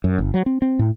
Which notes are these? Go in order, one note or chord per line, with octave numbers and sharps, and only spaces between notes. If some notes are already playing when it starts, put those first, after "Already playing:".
F#2
G1
F#3
C4
C4
A2